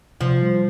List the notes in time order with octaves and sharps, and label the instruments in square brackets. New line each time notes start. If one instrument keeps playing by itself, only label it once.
[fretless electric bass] C3 [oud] F3
[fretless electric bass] G3